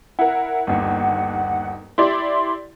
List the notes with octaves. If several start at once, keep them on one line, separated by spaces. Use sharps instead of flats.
E4 A#4 F#5
G1 D#2
E4 G4 D5 C6